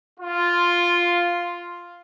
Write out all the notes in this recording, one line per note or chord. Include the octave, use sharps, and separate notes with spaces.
F4